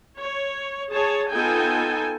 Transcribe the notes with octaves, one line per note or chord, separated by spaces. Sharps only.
C#5
G#4 C#5 A5
B3 D#4 F4 A4 G5 G#5